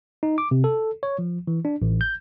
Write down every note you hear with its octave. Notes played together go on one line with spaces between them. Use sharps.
D#4
D6
C3
A4
C#5
F3
E3
D4
A1
G6